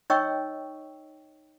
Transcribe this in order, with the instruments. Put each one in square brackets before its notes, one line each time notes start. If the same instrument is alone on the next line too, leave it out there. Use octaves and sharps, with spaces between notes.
[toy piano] D#4 C#5 D#5 G5 C#6 E6